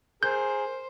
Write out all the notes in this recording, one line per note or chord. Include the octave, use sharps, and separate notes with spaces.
G#4 A#4 C5 G6